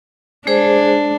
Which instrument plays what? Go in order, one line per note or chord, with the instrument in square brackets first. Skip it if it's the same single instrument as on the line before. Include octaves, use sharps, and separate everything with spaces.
[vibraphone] G#3 G#4 C5 [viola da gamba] D4